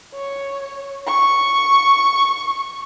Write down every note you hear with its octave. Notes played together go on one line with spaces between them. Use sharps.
C#5
C#6